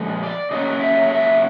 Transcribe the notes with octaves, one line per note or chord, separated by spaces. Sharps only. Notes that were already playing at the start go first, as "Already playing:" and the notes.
Already playing: A#2 F3 G#3
D5
C#3 F#3 A#3 C#4 D#5
E5
E5